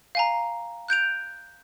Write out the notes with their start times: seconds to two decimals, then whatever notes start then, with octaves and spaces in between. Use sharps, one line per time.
0.15 F5 G#5 A#5
0.88 F#6 G6 D7 F7